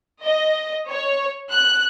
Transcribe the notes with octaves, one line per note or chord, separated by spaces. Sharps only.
D#5
C#5
F#6